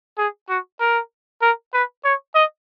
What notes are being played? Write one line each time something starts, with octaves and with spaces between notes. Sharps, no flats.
G#4
F#4
A#4
A#4
B4
C#5
D#5